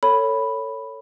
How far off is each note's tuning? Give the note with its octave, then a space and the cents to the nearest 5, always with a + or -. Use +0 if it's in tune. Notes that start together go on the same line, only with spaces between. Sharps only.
A4 +25 C#5 +0 B5 +0